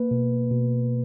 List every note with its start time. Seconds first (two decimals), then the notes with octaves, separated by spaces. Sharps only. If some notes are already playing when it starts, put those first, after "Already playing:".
Already playing: A#3 B4
0.11 B2
0.50 B2